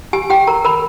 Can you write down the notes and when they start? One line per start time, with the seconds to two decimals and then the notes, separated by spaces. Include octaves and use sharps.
0.13 G4 G#5
0.30 G4 G5
0.47 A#4 A#5
0.64 A#4 B5